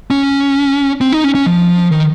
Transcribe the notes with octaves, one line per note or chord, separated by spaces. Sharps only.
C#4
C4
D#4
C#4
C#4
F3
D#3